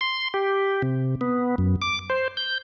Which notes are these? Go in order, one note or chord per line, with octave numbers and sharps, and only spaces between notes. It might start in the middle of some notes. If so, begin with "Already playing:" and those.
C6
G4
C3
B3
F#2
D6
C5
G6